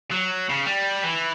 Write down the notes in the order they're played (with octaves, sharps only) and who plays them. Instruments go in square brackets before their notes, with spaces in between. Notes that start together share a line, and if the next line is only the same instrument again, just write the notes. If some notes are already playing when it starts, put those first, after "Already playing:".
[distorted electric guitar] F#3
C#3
G3
E3